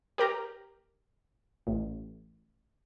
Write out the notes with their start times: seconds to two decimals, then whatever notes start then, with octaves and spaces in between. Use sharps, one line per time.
0.18 G4 A#4 A#5
1.67 A1